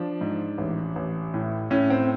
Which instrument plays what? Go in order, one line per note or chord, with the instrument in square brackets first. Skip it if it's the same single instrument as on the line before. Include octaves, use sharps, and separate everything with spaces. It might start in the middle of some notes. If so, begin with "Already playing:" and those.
Already playing: [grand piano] F3 D4
G#2
A1
A1
A2
A2 C#4
C4